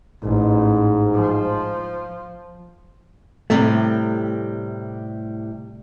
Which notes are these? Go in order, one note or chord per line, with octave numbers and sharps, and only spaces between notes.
A1 G#2
F3
A2 C3 G3 A3